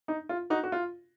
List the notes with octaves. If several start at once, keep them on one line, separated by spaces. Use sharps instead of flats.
D#4
F4
D#4 F#4
F#4
F4